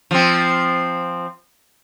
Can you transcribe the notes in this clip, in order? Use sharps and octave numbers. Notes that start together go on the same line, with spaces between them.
F3 C4